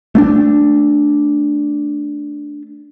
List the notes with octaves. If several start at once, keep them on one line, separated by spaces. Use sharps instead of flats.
A3 B3 D4